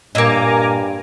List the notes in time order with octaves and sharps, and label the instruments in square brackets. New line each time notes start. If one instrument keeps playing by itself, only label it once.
[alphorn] G2 [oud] A#2 D#5 [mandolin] A#3 E6 [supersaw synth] G#5 A#5 D6